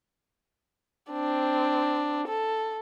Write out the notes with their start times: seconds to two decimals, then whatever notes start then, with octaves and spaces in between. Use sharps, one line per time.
1.11 C4 D4
2.28 A4